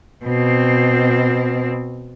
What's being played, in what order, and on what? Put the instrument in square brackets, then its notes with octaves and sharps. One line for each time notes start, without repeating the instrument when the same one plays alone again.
[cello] B2 C4